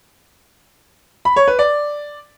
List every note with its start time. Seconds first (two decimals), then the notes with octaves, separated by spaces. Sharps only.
1.25 B5
1.36 C#5
1.48 B4
1.59 D5